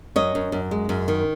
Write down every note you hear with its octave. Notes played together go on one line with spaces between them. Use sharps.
F#2 C#5 D#5
F#2
F#2
G#3
F#2
D#3